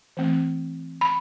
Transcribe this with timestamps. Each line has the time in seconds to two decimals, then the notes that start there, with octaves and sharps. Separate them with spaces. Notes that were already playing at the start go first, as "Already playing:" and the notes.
0.17 E3 A3 C4
1.01 B5